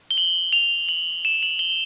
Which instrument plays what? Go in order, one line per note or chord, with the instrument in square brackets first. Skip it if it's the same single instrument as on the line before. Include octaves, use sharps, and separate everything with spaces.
[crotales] G7
F#7
F7
F#7
E7
F#7
G7